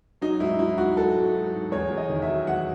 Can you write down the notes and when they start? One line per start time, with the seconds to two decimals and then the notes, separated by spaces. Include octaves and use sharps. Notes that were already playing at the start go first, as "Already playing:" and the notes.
0.21 F#3 D#4
0.40 G#2 E4
0.59 F#3 E4
0.78 G#2 F#4
0.96 F#3 A4
1.15 G#2
1.34 F#3
1.53 G#2
1.72 E2 C#5
1.90 E2
1.97 D#5
2.09 D#3
2.22 E5
2.29 F#3
2.47 E2 F#5